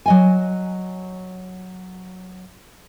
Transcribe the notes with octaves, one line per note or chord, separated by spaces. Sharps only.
F#3 D#5 G#5